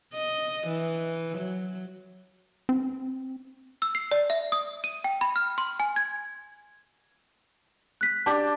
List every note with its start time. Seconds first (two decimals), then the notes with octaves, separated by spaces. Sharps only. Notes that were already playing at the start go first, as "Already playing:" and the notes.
0.14 D#5
0.68 E3
1.37 F#3
2.69 C4
3.82 E6
3.95 C7
4.11 D5
4.30 E5
4.52 D#6
4.84 D#7
5.04 G5
5.21 B5
5.36 F6
5.58 C6
5.80 G#5
5.96 G#6
8.01 F#6 B6
8.26 D4 G4 A5